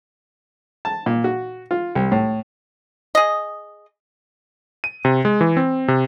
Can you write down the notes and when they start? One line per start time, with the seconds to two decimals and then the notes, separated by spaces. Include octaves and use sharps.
0.85 A5
1.06 A#2
1.24 F#4
1.71 F4
1.95 C2
2.12 A2
3.15 G#4 D#5
4.84 D#7
5.05 C3
5.25 G#3
5.41 E3
5.57 C4
5.88 C3